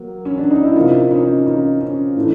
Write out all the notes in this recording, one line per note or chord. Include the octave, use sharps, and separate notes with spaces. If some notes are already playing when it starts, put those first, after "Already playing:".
Already playing: F#3 A#3
C#4
D4
D#4
E4
C3 F3 A#3 D#4 F4
C#4 D#4
C#4 D#4
C#4
A2 E3 A3 D4